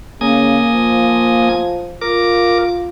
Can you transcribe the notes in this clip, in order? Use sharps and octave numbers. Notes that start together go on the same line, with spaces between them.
C#3 A#3 G#5 D#6
F3
F4 A#4 D6